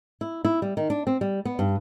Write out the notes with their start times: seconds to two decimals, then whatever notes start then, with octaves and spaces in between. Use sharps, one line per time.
0.21 E4
0.45 E4
0.62 G3
0.77 D#3
0.90 D4
1.07 C4
1.21 G3
1.45 B3
1.59 G2